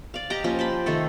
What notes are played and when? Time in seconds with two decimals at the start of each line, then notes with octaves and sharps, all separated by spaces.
0.14 D5 F5
0.30 G4 D#5 A#5 D6
0.44 F3 A#3 C#4 G4
0.59 C5 A5 B5
0.86 C3 D#3 A3 A4